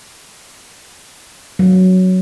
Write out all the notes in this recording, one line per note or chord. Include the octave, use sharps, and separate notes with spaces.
F#3